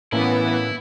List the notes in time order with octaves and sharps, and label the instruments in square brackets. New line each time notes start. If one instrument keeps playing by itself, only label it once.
[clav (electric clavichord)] A2 A#3 C#4 [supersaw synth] E3 B3 [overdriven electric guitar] E4